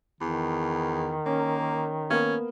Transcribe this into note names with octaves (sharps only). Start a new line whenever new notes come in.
E2 D#3
A#3 C#4
A#3 B3 C#4